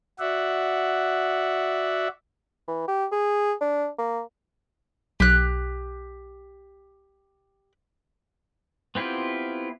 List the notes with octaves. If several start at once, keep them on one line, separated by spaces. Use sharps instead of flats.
F#4 D5 E5 F#5
E3
G4
G#4
D4
A#3
B1 G4 F#6
B3 C4 E4 F4 G4